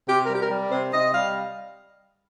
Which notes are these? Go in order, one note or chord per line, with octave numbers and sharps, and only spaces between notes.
C3 G4
G3 A#4
G4
A#4
G3
C3 C5
C3 D#5
G3 F5